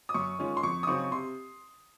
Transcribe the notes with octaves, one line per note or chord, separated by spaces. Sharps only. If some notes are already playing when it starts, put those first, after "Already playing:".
D#6
F#2 C#6
D#3 G#3 C#4 F4
C6
F2 C#6
D#6
C#3 F#3 C4 D#4 C#6
C3 C6